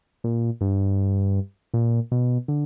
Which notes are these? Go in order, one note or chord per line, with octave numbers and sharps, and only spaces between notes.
A#2
G2
A#2
B2
D3